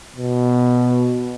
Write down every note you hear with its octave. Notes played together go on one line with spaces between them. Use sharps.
B2